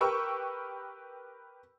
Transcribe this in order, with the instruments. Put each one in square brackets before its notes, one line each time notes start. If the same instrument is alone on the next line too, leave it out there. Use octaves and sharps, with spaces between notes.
[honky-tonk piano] G4 A#4 B4 G5 C#6 E6